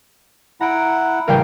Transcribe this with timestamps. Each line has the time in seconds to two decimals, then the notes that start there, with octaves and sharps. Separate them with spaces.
0.61 E4 F#5 A#5 D7
1.28 A1 C#3 G3 A#4 F5 G5